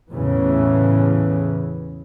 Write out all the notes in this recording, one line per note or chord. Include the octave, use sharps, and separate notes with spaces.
E2 A2 C#3 E3